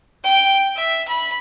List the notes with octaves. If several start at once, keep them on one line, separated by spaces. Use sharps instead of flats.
G5
E5
B5